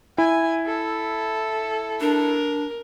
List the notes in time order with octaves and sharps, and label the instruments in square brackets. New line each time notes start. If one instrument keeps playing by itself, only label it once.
[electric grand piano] E4 [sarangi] G#5
[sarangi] A4
[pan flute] D4 [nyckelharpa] A#4